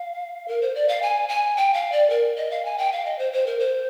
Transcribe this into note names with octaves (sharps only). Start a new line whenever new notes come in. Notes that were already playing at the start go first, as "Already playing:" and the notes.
Already playing: F5
A#4
C5
D5
F5
G#5
G#5
G5
F5
D5
A#4
D#5
F5
G#5
G5
F5
D#5
C5
C5
A#4
C5